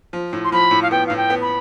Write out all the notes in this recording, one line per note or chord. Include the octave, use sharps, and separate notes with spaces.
F3
A2
C6
F3 B5
A2
F5
B3 G5
A2 F5
G5
B3
B5